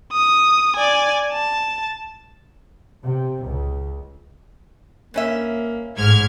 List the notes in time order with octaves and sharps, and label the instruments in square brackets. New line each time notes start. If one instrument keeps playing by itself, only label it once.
[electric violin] D#6
D5 G#5
A5
[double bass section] C3
C#2
[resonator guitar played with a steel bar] G2 C#4 E5 [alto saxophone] A#3
[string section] A1 F6 G#6 [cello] G#2